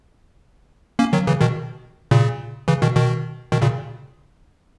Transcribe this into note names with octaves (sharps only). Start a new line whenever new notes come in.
A#3 C#4
D#3 F#3
C#3 E3
B2 D#3
A#2 C#3
C#3 E3
B2 D#3
B2 D#3
B2 D#3
A#2 C#3